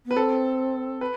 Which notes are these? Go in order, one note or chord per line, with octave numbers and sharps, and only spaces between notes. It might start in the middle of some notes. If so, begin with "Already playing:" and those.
B3 B4
C4 A4
B4